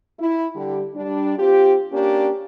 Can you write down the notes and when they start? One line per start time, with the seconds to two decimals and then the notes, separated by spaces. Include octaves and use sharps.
0.19 E4
0.56 D3 G3 G4
0.94 G3 D4
1.38 C4 F4 G4
1.92 A#3 C#4 D4 G4